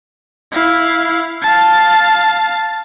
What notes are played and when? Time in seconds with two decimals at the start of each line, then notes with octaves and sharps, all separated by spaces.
0.52 E4 F5
1.42 F5 A5